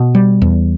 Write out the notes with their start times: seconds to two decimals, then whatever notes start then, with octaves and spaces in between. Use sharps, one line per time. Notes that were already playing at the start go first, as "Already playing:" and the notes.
Already playing: B2
0.15 G3
0.42 E2